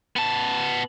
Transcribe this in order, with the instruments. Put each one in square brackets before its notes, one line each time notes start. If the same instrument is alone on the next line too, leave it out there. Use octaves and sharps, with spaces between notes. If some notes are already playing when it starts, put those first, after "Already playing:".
[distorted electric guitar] B3 A5